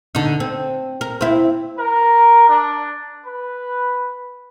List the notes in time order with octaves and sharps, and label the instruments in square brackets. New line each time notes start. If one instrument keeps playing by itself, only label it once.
[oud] D3 D#4
C4
A#4
C4 E4
[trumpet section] A#4
D4
B4